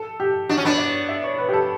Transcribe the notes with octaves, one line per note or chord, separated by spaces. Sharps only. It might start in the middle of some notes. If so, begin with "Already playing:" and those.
Already playing: A4
G4
D4 F#4
C#4
B3 D4
D5
E5
C#5
B4
G4
A4